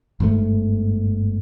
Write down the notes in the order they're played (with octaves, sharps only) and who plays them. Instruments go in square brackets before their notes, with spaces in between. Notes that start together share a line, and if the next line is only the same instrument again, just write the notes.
[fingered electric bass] G1 G#2 D3 A3